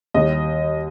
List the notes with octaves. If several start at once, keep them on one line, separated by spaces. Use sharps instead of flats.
D#2 D#3 G3 D#5